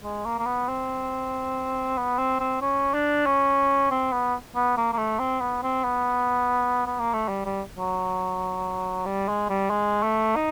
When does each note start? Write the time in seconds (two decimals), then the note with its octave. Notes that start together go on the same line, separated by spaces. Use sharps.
0.03 G#3
0.25 A#3
0.39 A#3
0.46 B3
0.68 C4
1.98 B3
2.18 C4
2.40 C4
2.62 C#4
2.94 D4
3.26 C#4
3.91 C4
4.12 B3
4.55 B3
4.77 A#3
4.93 A#3
4.97 A3
5.19 C4
5.41 B3
5.63 C4
5.84 B3
6.86 B3
6.99 A#3
7.13 A3
7.28 G3
7.45 G3
7.78 F#3
9.06 G3
9.28 G#3
9.49 G3
9.70 G#3
10.03 A3
10.36 D#4